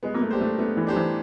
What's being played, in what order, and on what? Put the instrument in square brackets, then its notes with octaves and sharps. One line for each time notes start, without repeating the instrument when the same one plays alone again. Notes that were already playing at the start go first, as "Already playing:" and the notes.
[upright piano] G#3 [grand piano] B3
[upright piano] A#3
A3
[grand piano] D4 G4 C5
[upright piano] A3
[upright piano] A3 [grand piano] B3
[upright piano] E3
[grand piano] D4 G4 C5
[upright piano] E3